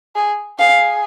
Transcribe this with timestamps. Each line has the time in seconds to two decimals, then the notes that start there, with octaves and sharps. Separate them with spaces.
0.16 G#4
0.59 G#4 F5